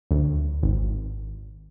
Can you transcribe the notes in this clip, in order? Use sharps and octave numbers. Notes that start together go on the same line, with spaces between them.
D2
G#1